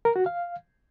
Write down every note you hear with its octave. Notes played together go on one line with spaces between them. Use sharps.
A#4
F#4
F5